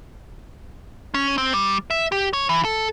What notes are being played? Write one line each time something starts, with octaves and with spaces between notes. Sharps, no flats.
C#4
C4
G3
E5
G4
C#5
E3
A4